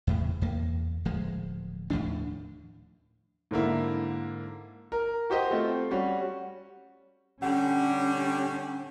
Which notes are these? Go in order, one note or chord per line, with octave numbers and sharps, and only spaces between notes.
E2 A2 C#3
E2 A#3
D1 F3 G#3
D#2 A2 F3 D4
G#2 D3 A#3 E4
A#4
F#4 G4 C5 D#5
A3 C4 F4
G3 C#4 F#4
D3 G3 C#4 F#5